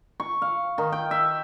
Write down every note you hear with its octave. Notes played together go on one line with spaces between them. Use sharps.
C#6
F5
D#3
G5
E5